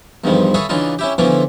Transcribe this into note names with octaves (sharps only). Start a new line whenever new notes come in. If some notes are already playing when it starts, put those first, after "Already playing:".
E2 G2 D#3 F3
G#4 A4 B4 C#5 E5 F5
C#3 E3 D4 D#4 F4
C#4 E4 G4
D3 E3 F3 B3 C#4 D6